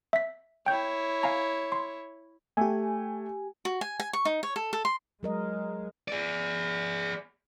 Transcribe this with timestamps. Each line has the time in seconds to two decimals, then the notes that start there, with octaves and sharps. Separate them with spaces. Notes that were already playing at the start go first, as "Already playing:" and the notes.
0.13 E5 B6
0.66 E4 C#5 G5 G6
1.23 F5 G#5 A#5
1.72 C6
2.57 A3 G4 G#5
3.65 F#4
3.81 G#5
4.00 G#5
4.13 C#6
4.25 D#4
4.43 C#5
4.56 A4
4.73 A4
4.85 C6
5.23 F#3 G#3 A#4 D#5
6.08 G#4 D5